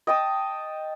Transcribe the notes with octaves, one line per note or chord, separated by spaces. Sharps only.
D#5 G5 A5 D#6